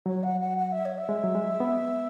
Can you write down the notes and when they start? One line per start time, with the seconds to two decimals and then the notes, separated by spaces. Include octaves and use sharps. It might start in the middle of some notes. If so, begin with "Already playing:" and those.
0.06 F#3 C#5
0.23 F#5
0.40 F#5
0.57 F#5
0.72 E5
0.85 C#5
0.98 E5
1.09 G#3
1.24 F#3
1.35 G#3
1.60 B3